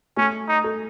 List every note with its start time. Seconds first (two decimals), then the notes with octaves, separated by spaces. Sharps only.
0.17 A3 C#4
0.48 D#4
0.64 A4